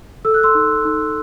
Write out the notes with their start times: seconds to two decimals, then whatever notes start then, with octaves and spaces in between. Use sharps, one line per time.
0.25 A4 E6
0.34 F#6
0.43 C6 E6
0.55 D#4
0.85 D#4